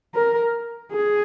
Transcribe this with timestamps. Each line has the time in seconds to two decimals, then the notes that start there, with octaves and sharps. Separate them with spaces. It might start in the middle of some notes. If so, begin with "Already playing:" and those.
0.15 A#4
0.91 G#4